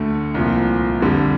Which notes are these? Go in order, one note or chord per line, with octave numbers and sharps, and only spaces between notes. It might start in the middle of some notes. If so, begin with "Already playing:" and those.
Already playing: D2 D3 A3
C2 A#2 F3
F2 D3 G3